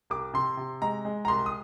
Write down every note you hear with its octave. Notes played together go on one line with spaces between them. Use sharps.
C2 D6
C3 C6
C3
G#3 A#5
G#3
A#5
C2 C6
D#6